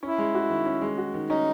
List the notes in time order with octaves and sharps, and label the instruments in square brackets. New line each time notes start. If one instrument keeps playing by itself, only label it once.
[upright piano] C#4 [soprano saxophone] E4
[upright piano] G#3
F#4
D#3
C#4
G#3
F#4
D#3
[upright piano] C#4 [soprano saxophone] D#4